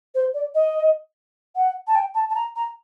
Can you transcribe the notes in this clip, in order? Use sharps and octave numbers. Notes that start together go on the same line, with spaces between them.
C5
D5
D#5
F#5
A5
G5
A5
A5
A#5
A#5